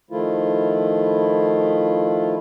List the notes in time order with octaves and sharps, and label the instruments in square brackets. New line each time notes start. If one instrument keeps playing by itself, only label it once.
[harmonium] D#3 F3 A3 E4 F4